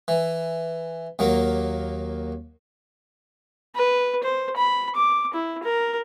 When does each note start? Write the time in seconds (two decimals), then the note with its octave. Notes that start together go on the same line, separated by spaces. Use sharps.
0.08 E3
1.19 D#2 F#3 A#3
3.75 B4
4.23 C5
4.56 B5
4.95 D6
5.34 E4
5.63 A#4